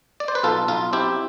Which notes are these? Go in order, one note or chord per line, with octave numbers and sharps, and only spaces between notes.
D5
C5
B4
B1 F4 A4
B1 F4
C4 E4 G4